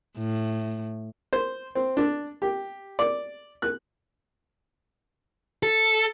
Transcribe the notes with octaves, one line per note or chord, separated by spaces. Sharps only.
A2
C5
C4
D4
G4
D5
F#6
A4